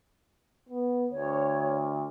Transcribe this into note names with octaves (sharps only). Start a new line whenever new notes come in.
B3
D2 C#5